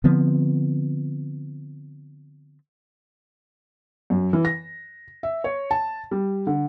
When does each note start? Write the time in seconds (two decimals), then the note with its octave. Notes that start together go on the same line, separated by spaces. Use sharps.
0.04 D3 F3 B3 C4
4.10 F#2
4.33 E3
4.45 A#6
5.23 E5
5.44 C#5
5.71 A5
6.11 G3
6.47 D3